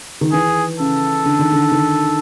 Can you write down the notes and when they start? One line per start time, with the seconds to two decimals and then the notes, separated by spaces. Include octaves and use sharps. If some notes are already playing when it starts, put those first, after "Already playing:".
0.21 D#3
0.32 E3 G#4
0.79 C#3 A4
1.25 D3
1.39 D#3
1.53 D3
1.72 D#3